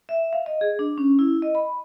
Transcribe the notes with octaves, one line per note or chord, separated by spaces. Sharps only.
E5
F5
D#5
G#4
D4
C#4
E4
D#5
B5